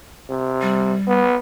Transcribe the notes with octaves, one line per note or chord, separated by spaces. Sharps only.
C3
G3
B3